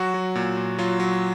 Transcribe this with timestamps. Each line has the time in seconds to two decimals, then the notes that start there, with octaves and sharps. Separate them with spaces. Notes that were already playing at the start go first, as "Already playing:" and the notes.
Already playing: F#3 F#4
0.14 F#3
0.35 A#2
0.57 A#2
0.78 F#3 F4
1.00 F#3